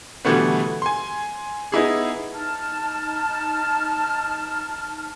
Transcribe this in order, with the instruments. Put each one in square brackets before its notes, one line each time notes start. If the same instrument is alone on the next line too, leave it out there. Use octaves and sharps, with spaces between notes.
[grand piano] B2 D3 E3 G3 A3 B3
G#5 C6
B3 D#4 E4 G#4
[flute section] D#4 A5 F6